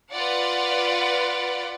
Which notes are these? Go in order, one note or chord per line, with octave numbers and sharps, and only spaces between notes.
F4 B4 D5 F#5